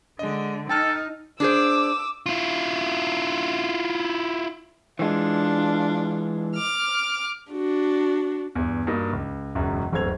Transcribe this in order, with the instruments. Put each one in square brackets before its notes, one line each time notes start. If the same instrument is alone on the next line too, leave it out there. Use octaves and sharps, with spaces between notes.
[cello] D3 [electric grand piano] G#3 D#5
[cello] D#4 [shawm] A4 [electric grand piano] G5 A5 F6
[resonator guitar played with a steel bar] D4 G#4 C5 [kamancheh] D6 E6
[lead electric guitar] E4 F4
[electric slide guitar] E3 G#3 [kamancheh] D4 F4
[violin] D6 F6
[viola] D4 F#4
[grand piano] E2 G2
G2 A#3 D#4 F#4
C#2
E1 C#2 F#2 E5
D1 G1 C4 A4 G#6 F7